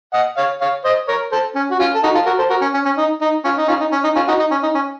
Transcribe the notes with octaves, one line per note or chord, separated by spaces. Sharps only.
D#5 F#5
C#5 F5
C#5 F5
C5 D#5
A#4 C#5
A4 C5
C#4
F#4
C#4 F4
A4
D#4 F#4
F4 A4
F#4 A#4
A4 C5
F#4 A#4
C#4
C#4
C#4
D#4
D#4
C#4 F4
D#4
C#4 F4
D#4
C#4
D#4
C#4 F4
D#4 F#4
D#4
C#4
D#4
C#4